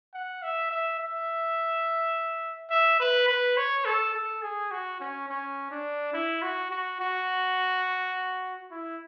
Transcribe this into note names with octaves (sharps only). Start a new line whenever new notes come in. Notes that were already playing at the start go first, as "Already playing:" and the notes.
F#5
E5
E5
E5
E5
B4
B4
C#5
A4
A4
G#4
F#4
C#4
C#4
D4
E4
F#4
F#4
F#4
E4